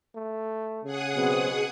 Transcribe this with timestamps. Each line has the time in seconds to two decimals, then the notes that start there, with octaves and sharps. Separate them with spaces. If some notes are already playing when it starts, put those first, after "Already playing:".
0.15 A3
0.84 C#3 G#4 F#5 D#6
1.15 B2 F#3 B3 C4